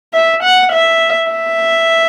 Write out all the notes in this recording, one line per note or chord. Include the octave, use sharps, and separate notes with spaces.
E5
F#5
E5
E5